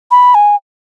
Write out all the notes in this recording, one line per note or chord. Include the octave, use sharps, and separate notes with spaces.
B5
G#5